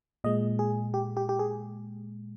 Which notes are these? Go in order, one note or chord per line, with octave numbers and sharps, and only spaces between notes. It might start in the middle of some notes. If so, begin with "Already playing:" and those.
A#2 G#3 D#5
G#4
G4
G4
G4
G#4